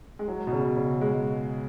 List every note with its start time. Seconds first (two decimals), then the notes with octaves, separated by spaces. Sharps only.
0.19 G#3
0.28 F#3
0.47 B2
0.53 C#3
0.77 C#3
1.01 G#3